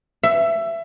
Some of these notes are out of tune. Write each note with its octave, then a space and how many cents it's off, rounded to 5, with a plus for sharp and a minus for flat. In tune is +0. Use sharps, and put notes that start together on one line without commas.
E5 +20